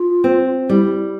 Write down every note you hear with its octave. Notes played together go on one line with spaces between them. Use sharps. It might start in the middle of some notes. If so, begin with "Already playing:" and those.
Already playing: F4
C4
G3 E4